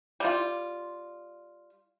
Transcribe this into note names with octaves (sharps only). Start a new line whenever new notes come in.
G3 F4